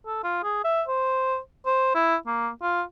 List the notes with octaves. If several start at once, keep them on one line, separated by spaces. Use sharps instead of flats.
A4
F4
G#4
E5
C5
C5
E4
A#3
F4